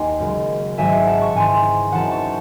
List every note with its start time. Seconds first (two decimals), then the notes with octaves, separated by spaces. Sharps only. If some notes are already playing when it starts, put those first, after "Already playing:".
Already playing: D#2 G#5 C6
0.20 F#1 F#2 C#3 G#3
0.78 G#1 G#2 F#3 E5 G#5
1.07 F#5 A5
1.21 A5 C#6
1.33 G#2 E3 C4 G#5 C6
1.91 F#2 E3 C4 D#4 F#5 A5
2.11 A5 C#6